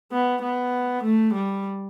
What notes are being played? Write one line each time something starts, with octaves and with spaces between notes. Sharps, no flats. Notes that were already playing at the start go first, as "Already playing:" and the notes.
B3
B3
A3
G3